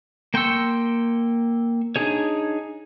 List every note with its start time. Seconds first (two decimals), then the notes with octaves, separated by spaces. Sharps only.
0.34 A#3 G5 C6 C#6 E6
1.96 D4 D#4 G#4 C#5